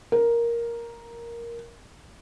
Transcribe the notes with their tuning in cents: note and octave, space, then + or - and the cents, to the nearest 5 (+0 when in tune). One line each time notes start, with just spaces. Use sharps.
A#4 +5